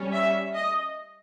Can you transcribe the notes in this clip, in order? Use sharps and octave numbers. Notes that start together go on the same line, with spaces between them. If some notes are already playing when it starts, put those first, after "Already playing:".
Already playing: G3 C#4
E5
D#5